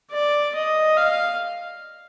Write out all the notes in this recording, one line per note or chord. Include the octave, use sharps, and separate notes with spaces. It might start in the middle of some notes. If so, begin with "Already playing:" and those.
D5
D#5
F5